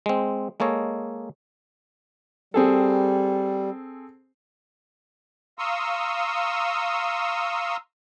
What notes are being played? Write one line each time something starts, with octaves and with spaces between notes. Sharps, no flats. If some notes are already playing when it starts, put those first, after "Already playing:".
G#3 C4
G#3 A#3 A4 C#5 D#5
G3 C4 G#4 A4
F5 A#5 C6 C#6 D#6 E6